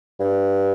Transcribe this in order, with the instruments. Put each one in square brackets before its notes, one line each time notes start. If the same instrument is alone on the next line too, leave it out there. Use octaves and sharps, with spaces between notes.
[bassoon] G2